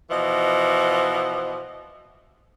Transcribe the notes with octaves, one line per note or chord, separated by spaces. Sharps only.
B2 E3 F3 D#5